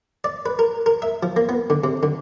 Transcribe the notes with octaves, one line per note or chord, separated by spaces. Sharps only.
D5
B4
A#4
A#4
E5
F3
A#3
B3
D3
C3
D3